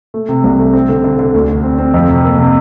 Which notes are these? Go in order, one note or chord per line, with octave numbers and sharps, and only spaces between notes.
A3
C3
C2
A3
C4
D3
D3
D3
D2
D3
C4
C4
F2
C3
A#3
C3